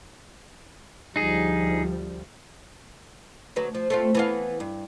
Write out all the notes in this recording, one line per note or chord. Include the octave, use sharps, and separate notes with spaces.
D2 F3 G3 D#4 G#4
D2 F#3 B4
F3
A3 C4 F4
E3 B3 F5
G2